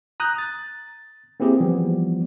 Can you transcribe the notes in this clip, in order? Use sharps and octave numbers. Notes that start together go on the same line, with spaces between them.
A#5 D#6 F#6 G6
A6
A#3 C4 E4 G4 G#4
E3 F3 G3 B3